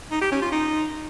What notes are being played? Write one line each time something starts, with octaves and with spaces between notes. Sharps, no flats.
D#4
G4
C#4
F4
D#4